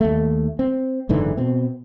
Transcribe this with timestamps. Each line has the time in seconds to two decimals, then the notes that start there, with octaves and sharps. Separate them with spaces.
0.01 D#2 A3
0.59 C4
1.09 F#1 G#2 D3 E3
1.37 B2 C4